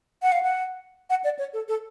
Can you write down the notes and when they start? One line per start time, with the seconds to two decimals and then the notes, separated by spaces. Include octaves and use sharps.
0.22 F#5
0.32 F5
0.43 F#5
1.10 F#5
1.24 D5
1.39 C#5
1.53 A4
1.68 A4